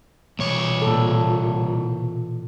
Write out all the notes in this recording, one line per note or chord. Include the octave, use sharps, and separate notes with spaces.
C2 B2 E3 C#5
A#2 A4